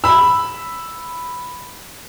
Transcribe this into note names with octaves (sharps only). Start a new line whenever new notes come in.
B5 E6